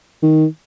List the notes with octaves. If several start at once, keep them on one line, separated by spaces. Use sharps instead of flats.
D#3